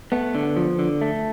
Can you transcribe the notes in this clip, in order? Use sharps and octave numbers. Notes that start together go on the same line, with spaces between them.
A3 B3
D3
F3
D3
A3